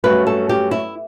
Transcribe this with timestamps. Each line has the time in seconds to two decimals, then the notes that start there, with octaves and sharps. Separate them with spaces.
0.04 G2 F#3 A3 C#4 F#4 B4
0.27 A4
0.49 G4
0.71 E4